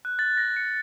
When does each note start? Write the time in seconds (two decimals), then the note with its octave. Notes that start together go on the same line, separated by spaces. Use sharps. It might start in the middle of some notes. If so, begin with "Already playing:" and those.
0.05 F#6
0.19 A6
0.37 A#6
0.56 C#7